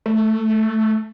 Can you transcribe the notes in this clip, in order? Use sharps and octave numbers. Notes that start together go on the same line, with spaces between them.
A3